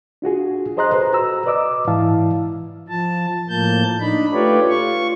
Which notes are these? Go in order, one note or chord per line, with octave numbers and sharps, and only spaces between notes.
D4 F4 F#4 G#4
G#4 C5 D#5 A#5 C6 F#6
A4 B4 C5
F#4 A#5 E6
B4 D5 D#5 D6 E6
G#2 E3 E4 F5 A5
F3 A5
A2 F3 A#3 A5 G6
D4 D#4 B5
A3 F4 G4 B4 C#5 D5
F4 C#6